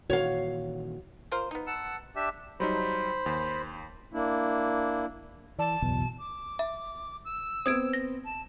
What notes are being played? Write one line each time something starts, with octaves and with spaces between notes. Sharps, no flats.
A#2 D#3 E3 F#4 C#5 F5
F4 A#4 C5
B3 D#4
F#5 A5 E6
D4 G4 E5
F#3 G3 D#4 C5 B5
D#2
A#3 D4 E4
E3 D5 A5
F#1 B1 E2 B2
D6
E5
E6
B3 C4 D#6 G#6 D7
A#6
A5